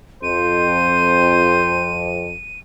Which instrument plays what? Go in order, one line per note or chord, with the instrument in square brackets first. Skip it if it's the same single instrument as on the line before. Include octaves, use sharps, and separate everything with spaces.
[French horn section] F2 [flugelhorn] C5 [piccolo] D#7